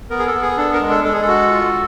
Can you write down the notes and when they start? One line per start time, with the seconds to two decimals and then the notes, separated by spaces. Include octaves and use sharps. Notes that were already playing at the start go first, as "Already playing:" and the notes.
0.10 B3 A#4
0.19 G#4
0.27 A4
0.34 B3
0.42 G#4
0.58 D4 A4
0.73 A#4
0.81 G#3
0.89 A4
1.04 G#3 A4
1.13 G#4
1.21 A4
1.28 F#4
1.51 F4